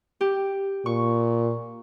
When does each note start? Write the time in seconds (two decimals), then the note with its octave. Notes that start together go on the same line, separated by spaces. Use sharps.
0.21 G4
0.86 A#2 C#6